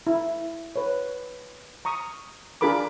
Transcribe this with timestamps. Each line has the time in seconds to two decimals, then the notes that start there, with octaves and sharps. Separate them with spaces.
0.07 E4
0.76 B4 C#5
1.85 A#5 C#6 D#6
2.61 D4 F4 G#4 A#4 B5 D6